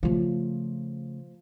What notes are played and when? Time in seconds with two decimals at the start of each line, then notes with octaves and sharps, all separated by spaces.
0.03 C#3 F3 A3